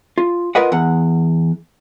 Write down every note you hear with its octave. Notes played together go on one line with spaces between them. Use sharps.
F4
F4 A#4 B4 D#5 F#5
E2 F#5